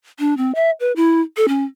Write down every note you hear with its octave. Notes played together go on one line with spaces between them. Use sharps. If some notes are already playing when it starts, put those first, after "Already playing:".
D4
C4
E5
B4
E4
A4
C#4